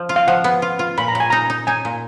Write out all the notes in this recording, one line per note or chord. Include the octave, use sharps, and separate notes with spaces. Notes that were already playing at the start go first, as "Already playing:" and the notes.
Already playing: F3
F4
F5
F3 F#5
B3
F4
F4
A#2 B5
A#5
A#2
G#5
D#4 A#5
D#4
D#4 G#5
A#2